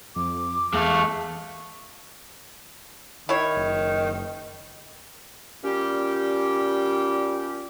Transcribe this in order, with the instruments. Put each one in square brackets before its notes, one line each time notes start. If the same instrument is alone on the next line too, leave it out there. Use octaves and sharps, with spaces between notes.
[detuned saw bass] F2 [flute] D6
[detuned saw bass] E2 [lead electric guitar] G#3 A4 [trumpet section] A3 F5 C#6
[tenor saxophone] D#3 [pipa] E4 C#5
[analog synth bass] F#1
[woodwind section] A#2 G3 C#4 G4